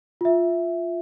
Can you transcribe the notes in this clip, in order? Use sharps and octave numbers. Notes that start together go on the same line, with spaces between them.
F4 E5